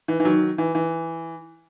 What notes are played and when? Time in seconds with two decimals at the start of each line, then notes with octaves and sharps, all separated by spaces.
0.08 E3
0.20 E3
0.25 D#3 F#3
0.58 E3
0.75 E3